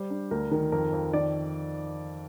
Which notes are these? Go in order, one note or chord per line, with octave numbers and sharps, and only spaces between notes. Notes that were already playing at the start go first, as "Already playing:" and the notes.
Already playing: G3 C5
D4
D2 A#4
D#3 A#4
F2 A#4
F2
D#3 D5